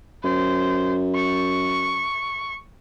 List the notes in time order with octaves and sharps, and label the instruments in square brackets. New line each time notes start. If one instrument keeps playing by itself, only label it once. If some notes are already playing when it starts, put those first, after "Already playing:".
[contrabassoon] F#2 [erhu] C5
[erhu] C#6